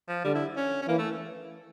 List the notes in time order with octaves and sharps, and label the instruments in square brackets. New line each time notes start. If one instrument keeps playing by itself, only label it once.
[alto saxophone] F3
[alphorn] D3 [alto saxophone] G3
[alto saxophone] E4
C#4
C#4
[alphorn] E3 [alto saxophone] A#3
[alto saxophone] A3